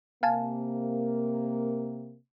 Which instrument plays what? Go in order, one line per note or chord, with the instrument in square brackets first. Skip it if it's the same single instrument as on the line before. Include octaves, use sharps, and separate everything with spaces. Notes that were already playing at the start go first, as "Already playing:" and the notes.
[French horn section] C3 A#3 A#4 [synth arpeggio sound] F5 G#5 A5